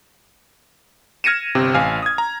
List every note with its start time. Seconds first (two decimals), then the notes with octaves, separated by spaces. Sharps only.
1.24 F6 G#6 A#6 C#7 D#7 E7
1.55 G1 C3 C4
1.74 A1 F5 G#5 F6
2.02 D#6 G#6
2.18 A#5